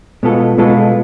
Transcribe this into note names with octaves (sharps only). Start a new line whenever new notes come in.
B2 G#3 B3 F4 A4
B2 G#3 B3 F4 A4